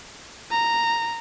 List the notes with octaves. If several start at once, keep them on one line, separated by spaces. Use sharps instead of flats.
A#5